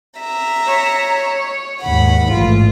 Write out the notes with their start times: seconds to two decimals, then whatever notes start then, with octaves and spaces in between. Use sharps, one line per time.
0.19 E5 A#5
0.67 C#5
1.83 D#2 G#2 F#5 B5
2.32 A1 G#2 E3 F4